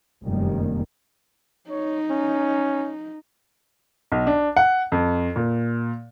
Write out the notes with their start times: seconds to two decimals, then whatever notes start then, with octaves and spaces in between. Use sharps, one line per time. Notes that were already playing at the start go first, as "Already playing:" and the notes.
0.23 F1 F#2 D#3 G3 A#3
1.70 D#4 C#5
2.10 C#4
4.12 B1
4.27 D4
4.56 F#5
4.92 F2
5.36 A#2